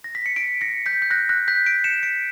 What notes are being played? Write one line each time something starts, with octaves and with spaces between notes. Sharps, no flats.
A#6
B6
C#7
B6 D7
A#6 C#7
G6 B6
G6
F#6 A#6
F#6 A#6
G6 B6
B6 D7
C#7 E7
B6 D7